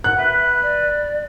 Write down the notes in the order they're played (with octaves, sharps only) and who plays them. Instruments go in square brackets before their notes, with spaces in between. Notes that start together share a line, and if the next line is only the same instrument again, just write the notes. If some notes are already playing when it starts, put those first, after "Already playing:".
[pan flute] F#5 [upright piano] F#6
[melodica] B4 [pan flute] E5
[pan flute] D5